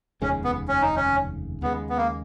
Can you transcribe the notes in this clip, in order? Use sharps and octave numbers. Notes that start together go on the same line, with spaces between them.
F1 D#2 C#3 G#3 C#4
B3
C#4
D#4
C#4
D#2 C#3 G#3 B3
B3
A#3